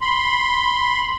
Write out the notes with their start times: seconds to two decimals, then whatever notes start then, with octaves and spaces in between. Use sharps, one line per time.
0.01 B5 C6